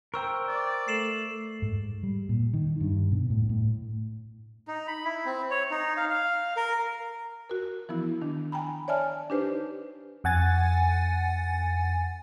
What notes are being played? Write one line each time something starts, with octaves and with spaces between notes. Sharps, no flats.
A#4 C5 G5 C#6 E6
D5
A3 C7 E7 F#7
G#2
G3
A#2
D#3
G2
B2
A2
A2
D#4
B5
E4
C4
C#5
D#4
F5
F5
A#4
F#4 A#4
E3 F3 B3 E4
D#3 D4
G5 G#5 A#5 B5
C#5 D5 E5 G#5 A5 F6
D4 D#4 G4 B4 C5
F2 F#5 G#5 A6